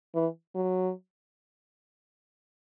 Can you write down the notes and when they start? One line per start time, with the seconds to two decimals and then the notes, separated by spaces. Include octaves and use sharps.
0.15 E3
0.55 F#3